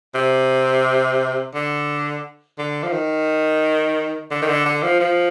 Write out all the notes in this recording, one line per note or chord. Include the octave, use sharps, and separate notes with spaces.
C3
D3
D3
F3
D#3
D3
D#3
D3
D3
F3
F3